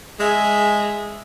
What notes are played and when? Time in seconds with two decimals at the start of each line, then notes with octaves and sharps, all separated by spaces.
0.20 G#3 G#4 E5